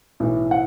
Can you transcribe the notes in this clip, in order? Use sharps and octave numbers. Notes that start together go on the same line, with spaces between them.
B1 A2 E3
F#5